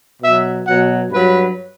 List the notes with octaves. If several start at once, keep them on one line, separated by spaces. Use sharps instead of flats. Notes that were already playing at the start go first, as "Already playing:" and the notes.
B2 F#3 E5
B2 F#3 F#5
G2 F#3 B4